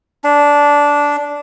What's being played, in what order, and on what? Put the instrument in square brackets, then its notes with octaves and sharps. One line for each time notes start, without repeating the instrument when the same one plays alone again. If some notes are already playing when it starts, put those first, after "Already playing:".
[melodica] D4